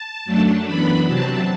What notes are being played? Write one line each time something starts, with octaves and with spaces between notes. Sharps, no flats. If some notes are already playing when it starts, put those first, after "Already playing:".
Already playing: A5
F#2 F#3 A3 D4
F#2 E3 B3 D4 B5
C3 F#3 C4 A5